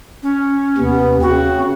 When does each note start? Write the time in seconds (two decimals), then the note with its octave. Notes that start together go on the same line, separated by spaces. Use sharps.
0.23 C#4
0.78 D#2 C3 B3
1.22 C#3 C4 F#4